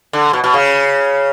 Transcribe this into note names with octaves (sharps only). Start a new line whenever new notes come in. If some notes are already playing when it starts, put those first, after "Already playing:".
D3
B2
B2
C#3